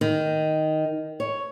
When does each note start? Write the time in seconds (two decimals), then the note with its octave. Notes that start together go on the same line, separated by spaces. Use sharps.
0.01 D#3
1.20 C#5